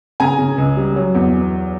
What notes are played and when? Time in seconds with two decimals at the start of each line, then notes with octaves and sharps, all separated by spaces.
0.20 C#3 G#5 A#5
0.38 C#3
0.58 C#2
0.77 G3
0.96 F#3
1.15 E2